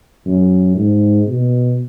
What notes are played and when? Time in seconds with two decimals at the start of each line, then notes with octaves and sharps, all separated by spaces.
0.26 F#2
0.76 G#2
1.27 B2